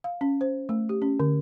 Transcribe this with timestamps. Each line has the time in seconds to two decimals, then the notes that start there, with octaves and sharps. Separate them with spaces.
0.04 F5
0.21 C#4
0.41 C5
0.69 A3
0.89 G4
1.02 C#4
1.20 D3